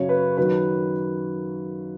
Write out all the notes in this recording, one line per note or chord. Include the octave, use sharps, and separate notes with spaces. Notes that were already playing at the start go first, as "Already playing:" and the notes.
Already playing: F#2 C#3 F#3 C#5
B4
F#2 D#3 F#3 B4